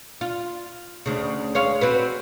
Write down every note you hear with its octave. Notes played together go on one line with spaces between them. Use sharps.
F4
D2 C#3
G#3 C#5 F5
C4 F#4 B4